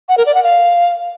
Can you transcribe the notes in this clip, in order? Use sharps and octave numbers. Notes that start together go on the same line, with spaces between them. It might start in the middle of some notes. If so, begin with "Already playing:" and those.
F#5
A#4
D5
F#5
F5